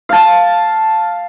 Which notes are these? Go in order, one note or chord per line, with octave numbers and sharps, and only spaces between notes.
F5 A5